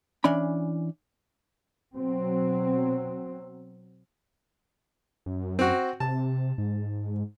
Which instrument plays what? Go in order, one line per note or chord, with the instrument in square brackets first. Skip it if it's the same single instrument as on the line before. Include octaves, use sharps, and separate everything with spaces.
[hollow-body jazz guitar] E3 C#4 D4 B5
[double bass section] B2 F#3 C4
[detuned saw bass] F#2
[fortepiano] C4 F#4
[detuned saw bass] C3 [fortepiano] A5
[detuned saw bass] G#2